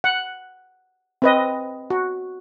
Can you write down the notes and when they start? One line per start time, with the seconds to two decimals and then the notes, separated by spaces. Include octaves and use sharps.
0.04 F#5
1.22 C4 B4 D#5
1.90 F#4